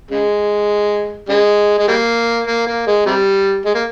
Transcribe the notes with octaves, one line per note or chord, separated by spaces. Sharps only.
C#3 G#3
C#3 G#3
G#3
G3 A#3
A#3
A#3
G#3
C3 G3
G#3
A#3